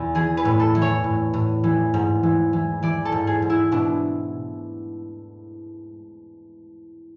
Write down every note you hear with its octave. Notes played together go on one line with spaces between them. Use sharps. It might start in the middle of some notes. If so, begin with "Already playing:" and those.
Already playing: E2 B2
E3 G#4
B4
A2
A4
E3
C#5
A2
A2
E3
G#2
E3
E3
E3 D5
A4
G#2
G#4
G#2
E4
B2 D4